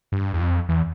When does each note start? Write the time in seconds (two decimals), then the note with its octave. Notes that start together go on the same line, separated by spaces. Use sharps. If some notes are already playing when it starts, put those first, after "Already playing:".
0.12 G2
0.33 E2
0.40 F2
0.69 E2